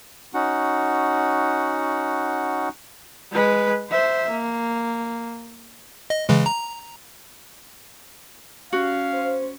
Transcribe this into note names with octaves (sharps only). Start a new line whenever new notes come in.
C#4 D#4 F#4 F#5
G#3 B4
C5 E5
A#3
D#5
C#3 E3 G#3
A#5
C#4 F#4 F5
C5